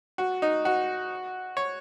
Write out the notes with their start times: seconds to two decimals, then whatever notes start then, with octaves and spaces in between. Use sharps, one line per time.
0.18 F#4
0.42 D#4
0.65 F#4
1.57 C#5